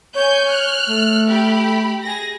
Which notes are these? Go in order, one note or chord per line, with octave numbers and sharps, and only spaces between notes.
C#5 G#5 G6
F6 F#6
A3
G4 B5
G#4 A#6